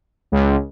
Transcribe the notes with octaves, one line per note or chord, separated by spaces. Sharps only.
C#2